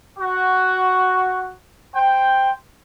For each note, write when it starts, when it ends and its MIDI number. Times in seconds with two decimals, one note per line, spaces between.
0.18 1.53 66
1.94 2.50 72
1.94 2.50 79